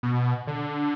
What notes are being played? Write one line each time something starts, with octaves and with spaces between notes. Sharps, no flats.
B2
D3